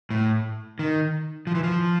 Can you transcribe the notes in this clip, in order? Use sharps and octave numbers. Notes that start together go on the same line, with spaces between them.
A2
D#3
F3
E3
F3